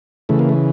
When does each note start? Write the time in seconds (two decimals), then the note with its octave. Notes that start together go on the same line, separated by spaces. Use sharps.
0.29 C#3 E3 A3
0.39 A#3
0.49 A3